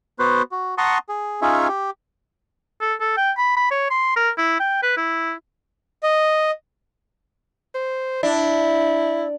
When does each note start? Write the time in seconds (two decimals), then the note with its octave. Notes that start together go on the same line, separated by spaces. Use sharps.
0.19 B3 F#4 B4 C5
0.52 F#4
0.78 F#5 A5 A#5 C6 C#6 D#6
1.09 G#4
1.42 C#4 D#4 F4 G#4 C#5 E5
1.68 G4
2.81 A4
3.00 A4
3.17 G5
3.37 B5
3.57 B5
3.71 C#5
3.90 C6
4.16 A#4
4.38 E4
4.60 G5
4.83 B4
4.97 E4
6.03 D#5
7.75 C5
8.23 D4 E4